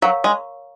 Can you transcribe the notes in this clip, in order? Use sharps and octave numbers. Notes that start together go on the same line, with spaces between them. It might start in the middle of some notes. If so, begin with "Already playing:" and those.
F#3 A#4 C#5 F5 A#5 C#6
G#3